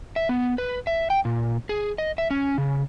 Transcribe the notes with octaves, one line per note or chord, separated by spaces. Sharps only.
E5
B3
B4
E5
G5
A#2
G#4
D#5
E5
C#4
C#3